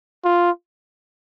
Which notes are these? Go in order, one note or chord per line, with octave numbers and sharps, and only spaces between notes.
F4